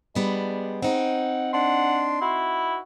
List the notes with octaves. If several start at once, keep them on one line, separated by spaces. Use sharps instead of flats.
G3 G#3 B3 D4
C4 D#4 F#5
D4 F#5 C6
E4 F#4